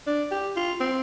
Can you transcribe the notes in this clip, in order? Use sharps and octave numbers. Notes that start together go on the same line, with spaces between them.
D4
G4
F4
C4